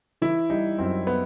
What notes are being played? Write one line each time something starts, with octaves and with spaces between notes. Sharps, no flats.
E3 E4
G3 D#4
F#2 C4
B3